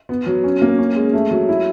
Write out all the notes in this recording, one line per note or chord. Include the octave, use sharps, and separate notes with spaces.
B3
F#3
C#4
A#3
C#4
G#3
A3
F#3
E4